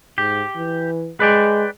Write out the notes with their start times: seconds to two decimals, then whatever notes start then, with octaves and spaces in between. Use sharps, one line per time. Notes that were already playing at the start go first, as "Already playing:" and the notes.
0.18 G#2 G4
0.56 E3
1.20 G#3 B4 D5 G5